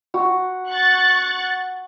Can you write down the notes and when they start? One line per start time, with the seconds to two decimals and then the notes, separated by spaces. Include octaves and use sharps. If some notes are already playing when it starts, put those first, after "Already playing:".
0.14 F#4
0.71 C#6 F#6 A6